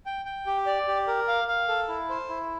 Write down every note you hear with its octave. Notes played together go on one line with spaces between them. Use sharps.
G5
G5
G4
D5
G4
A#4
F5
F5
A4
E4
C5
E4